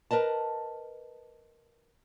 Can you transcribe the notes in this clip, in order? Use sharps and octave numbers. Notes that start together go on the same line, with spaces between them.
A#4 B4 D#5 A5